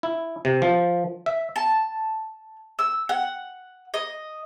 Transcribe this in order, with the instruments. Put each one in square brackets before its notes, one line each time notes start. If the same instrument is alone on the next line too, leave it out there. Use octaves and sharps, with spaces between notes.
[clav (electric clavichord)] E4
C3
F3
E5
[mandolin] A5
E6
F#5
D#5